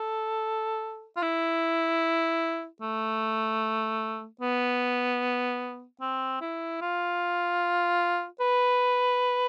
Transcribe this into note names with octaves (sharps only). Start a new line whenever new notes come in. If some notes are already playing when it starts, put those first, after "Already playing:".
Already playing: A4
F4
E4
A3
B3
C4
E4
F4
B4